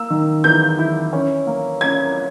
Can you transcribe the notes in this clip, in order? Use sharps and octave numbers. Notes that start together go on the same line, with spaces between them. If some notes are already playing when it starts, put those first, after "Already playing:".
Already playing: A#3 E6
D#3
E2 G6
E4
C#4
A#3
C#4 G#6